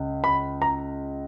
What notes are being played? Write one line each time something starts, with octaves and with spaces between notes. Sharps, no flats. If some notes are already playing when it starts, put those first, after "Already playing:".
Already playing: C#2 C#3
B5
A#5